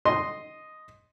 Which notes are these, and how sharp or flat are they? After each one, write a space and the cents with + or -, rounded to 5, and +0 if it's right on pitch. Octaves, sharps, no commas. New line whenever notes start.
D#5 +0 C6 +0